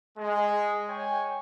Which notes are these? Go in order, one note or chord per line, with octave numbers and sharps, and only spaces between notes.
G#3
C#5 G5 G#5